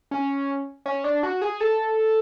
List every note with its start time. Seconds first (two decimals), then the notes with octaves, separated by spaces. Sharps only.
0.11 C#4
0.86 C#4
1.04 D4
1.23 F#4
1.42 G#4
1.60 A4